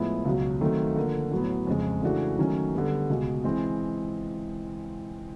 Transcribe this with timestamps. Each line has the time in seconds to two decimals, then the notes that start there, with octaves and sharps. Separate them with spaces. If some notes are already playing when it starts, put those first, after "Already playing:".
Already playing: A2 F3 G#3 B3 E4
0.25 C#2 B2 F#3
0.61 D#3 F#3 A3 C4
0.96 D3 F3 A#3
1.31 A2 F#3 B3
1.67 F2 C#3 F3 G#3
2.02 C#3 E3 A3 D4 F#4
2.39 D#3 F#3 A3 C#4
2.74 D3 G3 B3
3.09 C#2 B2 G#3
3.44 E3 G#3 C4